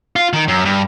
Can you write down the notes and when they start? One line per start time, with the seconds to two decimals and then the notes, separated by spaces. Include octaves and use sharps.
0.16 F4
0.33 D#3
0.48 F#2
0.65 G2